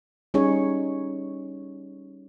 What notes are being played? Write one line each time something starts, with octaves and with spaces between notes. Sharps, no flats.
G3 C#4 D#4 G#4 C#5